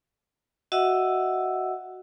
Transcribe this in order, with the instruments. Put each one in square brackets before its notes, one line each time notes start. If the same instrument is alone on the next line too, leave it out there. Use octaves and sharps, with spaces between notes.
[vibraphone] F#4 D#5 E5 F#5 E6